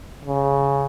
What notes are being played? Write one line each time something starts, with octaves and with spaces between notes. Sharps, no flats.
C#3